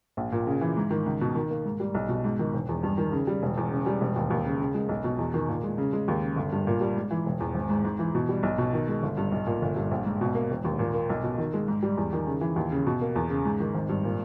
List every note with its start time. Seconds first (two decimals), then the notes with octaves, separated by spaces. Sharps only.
0.17 A#1
0.32 A#2
0.47 C#3
0.61 E3
0.77 G#2
0.91 D#3
1.06 C#2
1.21 B2
1.36 D#3
1.50 A#3
1.65 G#2
1.80 G3
1.95 B1
2.09 B2
2.24 G#2
2.39 D#3
2.53 E1
2.69 E2
2.83 G2
2.98 D#3
3.12 C#3
3.27 G3
3.42 E1
3.57 E2
3.71 C#3
3.86 G3
4.01 E1
4.16 D#2
4.30 D#2
4.46 C#3
4.60 C#3
4.74 G#3
4.89 B1
5.04 B2
5.18 E2
5.34 D#3
5.49 A#2
5.64 G#3
5.78 C#3
5.93 G#3
6.08 D#2
6.22 C#3
6.36 G1
6.52 G2
6.67 A#2
6.81 G3
6.96 G#2
7.11 E3
7.26 E1
7.40 E2
7.55 G#1
7.70 G#2
7.85 G#2
7.99 E3
8.15 B2
8.29 G3
8.43 B1
8.58 B2
8.73 D#3
8.88 G#3
9.03 G1
9.17 G2
9.32 B1
9.47 A#2
9.62 G1
9.76 G2
9.91 A#1
10.05 G#2
10.21 B2
10.35 A#3
10.51 E1
10.64 D#2
10.79 A#2
10.94 A#3
11.10 B1
11.24 B2
11.38 D#3
11.54 G#3
11.68 G#2
11.83 G3
11.97 E2
12.13 D#3
12.27 C#3
12.41 E3
12.56 D#2
12.71 C#3
12.87 B2
13.01 A#3
13.16 E2
13.30 C#3
13.45 G#2
13.60 D#3
13.74 G#1
13.89 G2
14.04 A#2